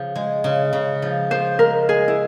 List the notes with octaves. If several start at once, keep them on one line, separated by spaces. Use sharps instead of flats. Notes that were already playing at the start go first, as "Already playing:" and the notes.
Already playing: C#3 F3
G#3
C#3
C#3
F3
F3 C5
G#3 A#4
G#3 G#4
E4